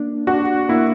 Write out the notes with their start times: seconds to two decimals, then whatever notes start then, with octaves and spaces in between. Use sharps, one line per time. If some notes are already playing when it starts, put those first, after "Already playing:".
Already playing: A#3 D4
0.27 D4 F#4
0.69 A#3 E4